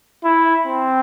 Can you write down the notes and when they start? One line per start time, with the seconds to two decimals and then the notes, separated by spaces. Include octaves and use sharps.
0.24 E4
0.66 C4